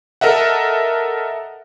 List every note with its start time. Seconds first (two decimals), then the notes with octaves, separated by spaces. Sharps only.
0.21 A4 A#4 D#5 E5 F#5